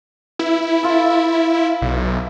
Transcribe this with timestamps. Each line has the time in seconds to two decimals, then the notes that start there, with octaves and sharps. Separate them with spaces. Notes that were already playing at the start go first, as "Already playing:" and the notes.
0.39 E4 B4
0.83 F4 A4 E5
1.82 B1